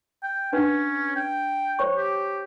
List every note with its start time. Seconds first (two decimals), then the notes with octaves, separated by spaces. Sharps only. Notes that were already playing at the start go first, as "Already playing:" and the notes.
0.23 G5
0.53 C#4 D4 B4 F#5
1.16 G5
1.79 C5 C#5 C#6
1.97 G4